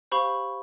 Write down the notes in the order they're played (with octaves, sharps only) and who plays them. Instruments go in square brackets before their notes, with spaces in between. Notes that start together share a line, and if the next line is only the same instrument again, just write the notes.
[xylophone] G4 C5 F5 B5 C#6